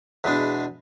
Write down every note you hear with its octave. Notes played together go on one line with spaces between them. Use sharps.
E2 B2 G#3 D4